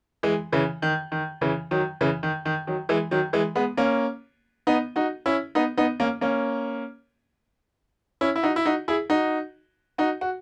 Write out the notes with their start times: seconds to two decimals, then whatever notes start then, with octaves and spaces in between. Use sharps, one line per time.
0.23 E3 G#3
0.52 C#3 E3
0.82 D#3
1.12 D#3
1.41 C#3 E3
1.71 D#3 F#3
2.01 C#3 E3
2.23 D#3
2.45 D#3
2.67 D#3 F#3
2.89 E3 G#3
3.11 D#3 F#3
3.33 E3 G#3
3.55 G#3 B3
3.77 A#3 C#4
4.67 B3 D#4
4.96 D#4 F#4
5.26 C#4 E4
5.55 B3 D#4
5.77 B3 D#4
6.00 A#3 C#4
6.21 A#3 C#4
8.21 C#4 E4
8.36 E4
8.43 D#4 F#4
8.56 E4
8.66 D#4 F#4
8.88 E4 G#4
9.10 D#4 F#4
9.98 D#4 F#4
10.21 F#4